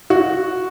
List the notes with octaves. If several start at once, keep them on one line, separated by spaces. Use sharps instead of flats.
F#4